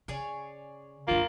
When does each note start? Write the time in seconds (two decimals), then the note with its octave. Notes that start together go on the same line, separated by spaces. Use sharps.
0.08 C#3 G#4 C#5 D5
1.08 F#2 D3 A#3 F4